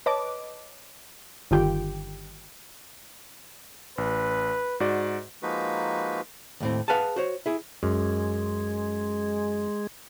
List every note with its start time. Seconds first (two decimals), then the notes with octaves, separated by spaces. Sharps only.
0.06 B4 C#5 D#5 A5 D6
1.51 G1 D3 D#3 F4 G4 G5
3.98 A1 B4
4.80 G#2 F#4 D5
5.43 F3 G#3 A#3 D#4 F#4 B4
6.60 D#2 A2 C4
6.88 G#4 B4 F5 F#5 G#5 A5
7.16 F#4 C5 C#5
7.46 E4 G#4
7.83 F#2 G#3